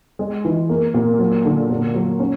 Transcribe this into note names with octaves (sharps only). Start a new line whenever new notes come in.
G#3
E3
A#3
A#2
F#3
D3
A#2
F#3
C#4